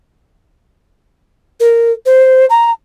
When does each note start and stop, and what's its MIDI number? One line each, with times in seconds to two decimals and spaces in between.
1.60 1.93 70
2.05 2.46 72
2.50 2.70 82